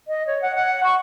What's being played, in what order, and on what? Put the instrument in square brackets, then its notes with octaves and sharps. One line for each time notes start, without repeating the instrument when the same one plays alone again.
[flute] D#5
C#5
F#5
F#5
C#6